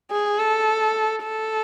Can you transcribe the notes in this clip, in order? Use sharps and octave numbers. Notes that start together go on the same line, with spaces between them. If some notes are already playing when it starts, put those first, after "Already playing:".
G#4
A4
A4